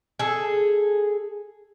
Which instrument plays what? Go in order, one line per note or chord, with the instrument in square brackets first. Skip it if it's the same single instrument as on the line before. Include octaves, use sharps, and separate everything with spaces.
[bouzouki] G#4 A4